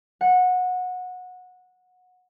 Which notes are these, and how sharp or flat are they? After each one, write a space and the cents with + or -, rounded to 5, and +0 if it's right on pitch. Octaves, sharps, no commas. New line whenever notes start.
F#5 -20